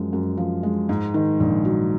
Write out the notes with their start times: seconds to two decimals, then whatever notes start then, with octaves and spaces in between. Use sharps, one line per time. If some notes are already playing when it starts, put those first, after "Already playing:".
Already playing: F#2 F3 G#3
0.13 F#2
0.37 F3
0.63 G#3
0.89 G#2
1.14 D#3
1.40 A#1
1.65 F#3